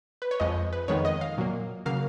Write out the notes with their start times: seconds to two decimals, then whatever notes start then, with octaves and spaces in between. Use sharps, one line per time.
0.22 B4
0.31 C#5
0.40 F2 F3 G#3 D#5
0.73 B4
0.88 F2 D#3 G#3 B3 C#5
1.05 D#5
1.21 F5
1.37 A#2 F#3 A#3
1.86 C#3 F#3 A#3 F5